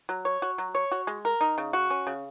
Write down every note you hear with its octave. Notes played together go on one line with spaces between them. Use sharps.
F#3
C#5
F#4
F#3
C#5
F#4
G#3
A#4
D#4
C#3
F#4
C#4
C#3